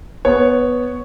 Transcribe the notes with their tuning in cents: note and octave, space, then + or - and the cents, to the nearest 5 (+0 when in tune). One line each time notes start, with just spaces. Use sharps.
B3 +0 C#5 +0